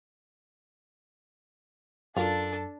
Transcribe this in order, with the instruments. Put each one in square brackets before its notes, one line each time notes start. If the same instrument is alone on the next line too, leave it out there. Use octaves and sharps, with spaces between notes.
[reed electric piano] F#2 [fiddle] D4 [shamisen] F4 A#4 [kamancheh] A4